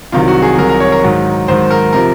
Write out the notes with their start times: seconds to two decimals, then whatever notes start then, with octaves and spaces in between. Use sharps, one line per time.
0.12 C2 C3 D#3 F#3 F4
0.28 F#4
0.42 G#4
0.58 C2 C3 D#3 F#3 A#4
0.69 A#4
0.80 C#5
0.92 A#4
1.03 G#2 D#3 F#3
1.48 G#2 D#3 F#3 C5
1.71 A#4
1.93 C3 F3 A#4